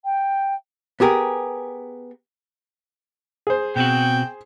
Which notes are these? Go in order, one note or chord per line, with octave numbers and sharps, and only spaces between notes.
G5
B3 G4 G#4 A#4
G#4 C5
B2 C4 F#4 G5